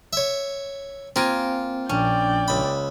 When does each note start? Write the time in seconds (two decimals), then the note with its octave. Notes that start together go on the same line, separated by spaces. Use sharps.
0.13 C#5 E5
1.16 A#3 C4 F4 A#4 G#5
1.89 A#1 C#4 D4 D5 G5
2.48 C#2 B5